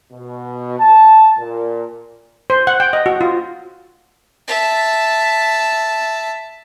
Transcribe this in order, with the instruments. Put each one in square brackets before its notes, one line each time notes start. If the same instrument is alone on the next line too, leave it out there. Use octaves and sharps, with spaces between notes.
[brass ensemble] B2
A5
A#2
[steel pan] C5
F#5
G5
D#5
F#4
F4
[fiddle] E5 A5